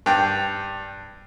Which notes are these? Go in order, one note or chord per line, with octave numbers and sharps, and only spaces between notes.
G2 G5